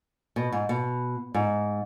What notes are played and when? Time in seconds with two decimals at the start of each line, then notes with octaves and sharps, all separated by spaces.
0.36 B2
0.52 G#2
0.69 B2
1.34 G#2